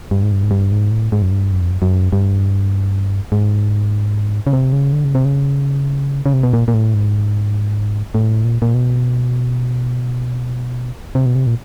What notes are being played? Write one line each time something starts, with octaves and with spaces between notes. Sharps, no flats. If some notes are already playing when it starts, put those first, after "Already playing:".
G2
G#2
G2
G#2
G2
G#2
A2
G#2
F#2
G2
F#2
F2
F#2
F#2
G2
G#2
C#3
C3
C#3
D3
C#3
C3
C#3
C#3
C3
B2
A#2
A#2
A2
G#2
A2
A#2
A#2
B2
C3
B2
C3
A#2